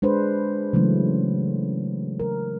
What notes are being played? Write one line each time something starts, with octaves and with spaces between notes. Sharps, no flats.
G#3 D4 B4 C5
C#3 E3 F#3 G#3 A3
A#4